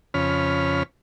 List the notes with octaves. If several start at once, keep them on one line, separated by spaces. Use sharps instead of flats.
F2 C#3 C#4 B5 F6